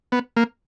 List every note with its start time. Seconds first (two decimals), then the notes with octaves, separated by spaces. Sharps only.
0.12 B3
0.37 A#3